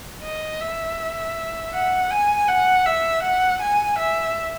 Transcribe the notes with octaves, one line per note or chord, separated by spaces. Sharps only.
D#5
E5
F#5
G#5
F#5
E5
F#5
G#5
E5